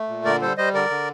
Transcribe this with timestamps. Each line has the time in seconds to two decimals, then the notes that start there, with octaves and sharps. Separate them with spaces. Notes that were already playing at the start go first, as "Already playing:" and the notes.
Already playing: A3
0.08 A#2
0.25 D3 A#4 D5
0.41 G3 A4 C5
0.57 G3 C5 D#5
0.74 D3 A#4 D5
0.90 D3